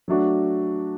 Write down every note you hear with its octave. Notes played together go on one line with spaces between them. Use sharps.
F#3 A3 D4 F#4